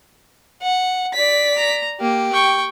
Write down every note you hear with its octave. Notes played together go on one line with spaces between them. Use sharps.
F#5
D5 B6
A#5
A#3 G4
G5 C#6